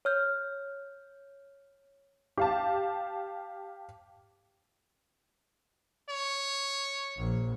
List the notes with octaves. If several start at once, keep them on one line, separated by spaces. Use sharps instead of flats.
C#5 F6 G6
G4 F5 A5
C#5
A#1